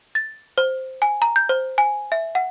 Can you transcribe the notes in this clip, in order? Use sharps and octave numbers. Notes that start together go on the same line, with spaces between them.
A6
C5
G#5
A#5
G6
C5
G#5
E5
F#5